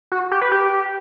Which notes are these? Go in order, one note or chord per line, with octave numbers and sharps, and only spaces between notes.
F#4
G4
B4
G4